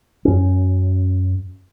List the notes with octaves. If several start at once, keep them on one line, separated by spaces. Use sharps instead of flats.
F#2 C#4